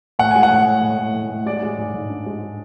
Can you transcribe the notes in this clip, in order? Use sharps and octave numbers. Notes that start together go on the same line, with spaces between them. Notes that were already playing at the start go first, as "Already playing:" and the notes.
A2 F#5
G#3 G#5
F#5
A2
A2
A2
A2
A2
A2
G#3 D5
G#3
G#2
G#2
D4
G#3